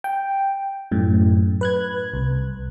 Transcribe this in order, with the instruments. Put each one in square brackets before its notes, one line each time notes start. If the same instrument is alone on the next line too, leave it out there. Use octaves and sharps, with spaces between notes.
[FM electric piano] G5
F#2 A2
B4 F#6 G#6
C2